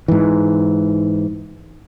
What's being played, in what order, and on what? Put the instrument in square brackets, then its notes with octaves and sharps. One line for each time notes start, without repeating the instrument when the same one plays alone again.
[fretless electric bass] G#2 E3